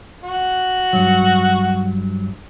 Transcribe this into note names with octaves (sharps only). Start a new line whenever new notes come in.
F#4
G2 F#3